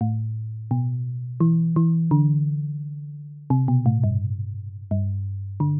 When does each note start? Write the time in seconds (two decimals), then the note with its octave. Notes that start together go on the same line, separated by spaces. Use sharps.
0.01 A2
0.71 B2
1.40 E3
1.76 E3
2.11 D3
3.50 C3
3.68 B2
3.86 A2
4.04 G2
4.91 G2
5.60 D3